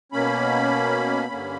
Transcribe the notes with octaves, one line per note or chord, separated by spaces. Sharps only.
B2 A#3 C#4 B5
G2 D3 A#3 C#4